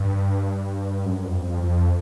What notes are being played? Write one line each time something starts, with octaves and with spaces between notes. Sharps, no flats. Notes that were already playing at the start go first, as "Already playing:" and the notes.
Already playing: G2
F#2
F2
F2
F2